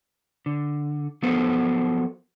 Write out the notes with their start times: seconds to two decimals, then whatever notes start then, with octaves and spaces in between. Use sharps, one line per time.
0.46 D3
1.23 F3 F#3 B3 A4 A#4 C5